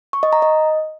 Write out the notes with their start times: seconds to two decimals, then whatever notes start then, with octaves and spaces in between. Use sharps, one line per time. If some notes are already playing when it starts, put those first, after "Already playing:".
0.13 C#6
0.23 D#5
0.33 A#5
0.42 D#5